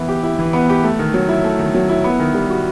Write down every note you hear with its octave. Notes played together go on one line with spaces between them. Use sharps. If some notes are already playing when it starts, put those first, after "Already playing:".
Already playing: E3 B3 E4
G4
E4
E3
B3
G4
A3
D#3
F#3
E4
A3
D#3
F#3
E4
B3
D#3
G3
F#4